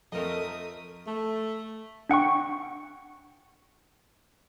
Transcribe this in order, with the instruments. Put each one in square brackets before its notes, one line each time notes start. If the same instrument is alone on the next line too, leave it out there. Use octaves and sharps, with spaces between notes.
[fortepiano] F2 C4 [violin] A3 D#6 [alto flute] A4 [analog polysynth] A#4 D#5
[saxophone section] A3
[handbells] D4 F#5 G5 C#6